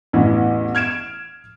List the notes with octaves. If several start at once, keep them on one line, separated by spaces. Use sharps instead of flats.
A1 E2 E3
F6 G#6 D7 E7